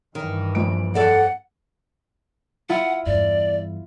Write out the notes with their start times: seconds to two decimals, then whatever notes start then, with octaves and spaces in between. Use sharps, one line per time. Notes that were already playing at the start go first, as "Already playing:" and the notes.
0.15 G2 D#3 E3
0.55 A#1 D7
0.95 F2 A4 D5 F#5
2.69 E4 F4 F#5
3.06 E2 G2 D5